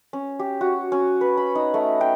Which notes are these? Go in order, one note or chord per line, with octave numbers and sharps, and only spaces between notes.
C#4
G4
F#4
C#4
B4
B5
D#4
A3
G5